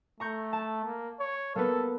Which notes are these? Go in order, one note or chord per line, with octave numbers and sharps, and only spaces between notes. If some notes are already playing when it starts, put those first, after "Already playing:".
A3 A#5 C#6 G6
A5
A#3
C#5
A#3 B3 A4 B4